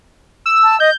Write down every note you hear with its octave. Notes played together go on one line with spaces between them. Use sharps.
E6
A5
D#5 G6